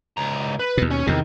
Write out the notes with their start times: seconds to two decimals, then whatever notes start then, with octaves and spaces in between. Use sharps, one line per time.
0.17 C#2 A#5
0.59 B4
0.77 D#2 B2
0.91 C#4 C#5
1.07 E2 C3 D#3